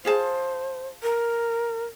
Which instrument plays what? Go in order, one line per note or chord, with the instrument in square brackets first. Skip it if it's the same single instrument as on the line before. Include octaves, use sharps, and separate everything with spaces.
[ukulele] F4 G#4 A5 [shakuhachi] C5
[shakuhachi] A#4